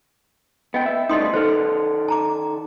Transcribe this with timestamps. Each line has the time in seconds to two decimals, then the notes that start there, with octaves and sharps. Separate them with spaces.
0.74 B3 D#5 G5
0.86 E5
1.09 G3 A3 D#4 D#5 C6 D#6
1.34 D#3 A4 B4 C5
2.08 A5 A#5 D6